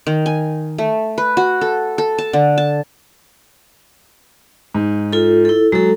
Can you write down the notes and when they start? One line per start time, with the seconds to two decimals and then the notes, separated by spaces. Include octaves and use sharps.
0.07 D#3
0.26 G#5
0.78 A3
1.18 B4
1.37 F#4
1.61 A4
1.98 A4
2.18 A5
2.33 D3
2.58 A5
4.75 G#2
5.13 F4 A4
5.45 E4 A4
5.72 F#3 G#3 A4